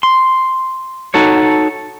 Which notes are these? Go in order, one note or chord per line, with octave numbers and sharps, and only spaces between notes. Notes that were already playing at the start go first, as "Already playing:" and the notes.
C6
D#4 F#4 A4 C#5